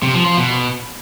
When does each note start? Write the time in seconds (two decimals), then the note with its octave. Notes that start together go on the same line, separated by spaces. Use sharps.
0.03 C3
0.14 F3
0.26 F3
0.37 B2